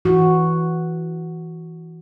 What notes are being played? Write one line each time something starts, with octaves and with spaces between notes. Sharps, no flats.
E3 F#4